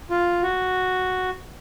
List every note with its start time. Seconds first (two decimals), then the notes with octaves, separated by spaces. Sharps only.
0.10 F4
0.43 F#4